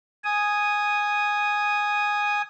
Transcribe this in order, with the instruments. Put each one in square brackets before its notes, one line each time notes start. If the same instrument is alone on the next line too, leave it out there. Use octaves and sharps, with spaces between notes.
[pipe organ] G#5 D#6